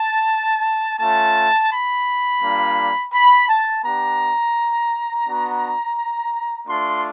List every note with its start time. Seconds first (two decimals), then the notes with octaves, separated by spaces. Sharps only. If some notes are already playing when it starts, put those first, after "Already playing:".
Already playing: A5
0.99 A3 C#4 F4 A5
1.71 B5
2.42 G3 A#3 D4 F4
3.12 B5
3.48 A5
3.83 B3 D4 G4 A#5
5.26 B3 D4 F#4
6.67 A3 D4 F4 C6